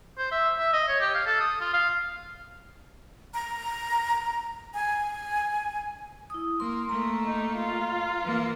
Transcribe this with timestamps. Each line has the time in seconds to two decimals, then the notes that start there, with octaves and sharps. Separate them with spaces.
0.18 C5
0.32 E5
0.59 E5
0.73 D#5
0.88 C#5
1.00 G4
1.15 F5
1.26 A4
1.40 D#6
1.61 F4
1.74 F5
3.34 A#5
4.74 G#5
6.30 E4 D#6
6.60 A#3 C6
6.89 A3 A#3 A#5
7.26 D#4
7.56 F4
8.23 E3 A#3